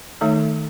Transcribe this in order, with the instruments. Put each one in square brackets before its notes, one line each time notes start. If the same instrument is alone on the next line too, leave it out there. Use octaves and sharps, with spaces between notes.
[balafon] D#3 A3 D#4 A4 C#5